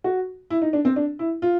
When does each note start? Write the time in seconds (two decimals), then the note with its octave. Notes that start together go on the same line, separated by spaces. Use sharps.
0.04 F#4
0.50 E4
0.62 D#4
0.73 D4
0.85 C4
0.96 D4
1.19 E4
1.42 F4